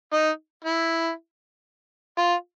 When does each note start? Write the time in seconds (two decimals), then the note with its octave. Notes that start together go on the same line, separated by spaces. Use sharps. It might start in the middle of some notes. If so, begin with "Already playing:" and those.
0.13 D#4
0.64 E4
2.18 F4